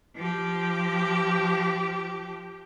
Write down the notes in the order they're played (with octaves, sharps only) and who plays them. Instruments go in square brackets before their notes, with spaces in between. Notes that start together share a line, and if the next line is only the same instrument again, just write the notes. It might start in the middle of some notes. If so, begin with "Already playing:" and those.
[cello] F3 G4